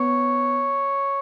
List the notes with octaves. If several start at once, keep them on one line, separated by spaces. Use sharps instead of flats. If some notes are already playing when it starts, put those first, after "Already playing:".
Already playing: B3 C#5